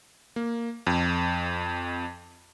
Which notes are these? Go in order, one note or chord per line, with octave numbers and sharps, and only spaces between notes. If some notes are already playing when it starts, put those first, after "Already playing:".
A#3
F2